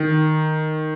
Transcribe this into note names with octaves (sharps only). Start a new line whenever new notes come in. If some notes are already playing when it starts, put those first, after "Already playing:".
Already playing: D#3